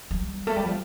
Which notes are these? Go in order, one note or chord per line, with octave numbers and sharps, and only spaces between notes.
G3
A3
G3
F3